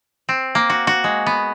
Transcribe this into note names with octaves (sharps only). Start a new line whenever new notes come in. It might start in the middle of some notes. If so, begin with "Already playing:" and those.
C4
A#3
F#4
F#4
G#3
B3